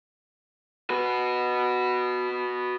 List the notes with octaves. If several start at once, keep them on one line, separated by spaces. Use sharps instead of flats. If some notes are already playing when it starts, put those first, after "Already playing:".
F#4 B4